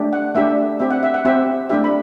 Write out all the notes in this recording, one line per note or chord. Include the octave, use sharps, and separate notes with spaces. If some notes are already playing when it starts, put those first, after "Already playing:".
Already playing: A3 D4 G4
F#5
A3 D4 G4 E5
C4 G4 E5
F#5
E5
F#5
C4 G4 E5
A3 D4 G4 E5
B5